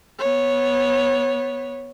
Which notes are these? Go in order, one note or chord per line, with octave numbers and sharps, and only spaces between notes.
B3 C#5